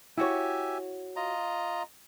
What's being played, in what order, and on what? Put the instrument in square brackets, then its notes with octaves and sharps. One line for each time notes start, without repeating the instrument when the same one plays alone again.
[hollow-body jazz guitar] E4 F#4 C#5 [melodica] G4 E5 G#5
[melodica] F4 D#5 A#5